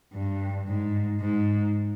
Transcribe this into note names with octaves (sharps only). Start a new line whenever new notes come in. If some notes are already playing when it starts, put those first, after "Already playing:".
G2
G#2
G#2